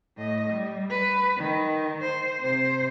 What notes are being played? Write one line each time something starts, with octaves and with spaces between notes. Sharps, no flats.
A2 D#5
G3
B4
D#3
C5
C3 C5